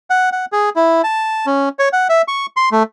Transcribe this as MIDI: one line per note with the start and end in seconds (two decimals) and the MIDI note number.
0.10 0.30 78
0.32 0.45 78
0.52 0.70 68
0.76 1.02 64
1.04 1.46 81
1.46 1.69 61
1.79 1.89 73
1.93 2.08 78
2.09 2.22 76
2.28 2.46 85
2.57 2.69 84
2.72 2.83 57